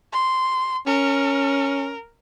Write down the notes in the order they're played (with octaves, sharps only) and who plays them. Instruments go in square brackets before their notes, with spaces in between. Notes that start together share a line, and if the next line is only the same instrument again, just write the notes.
[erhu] C6
[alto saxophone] C#4 [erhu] A#4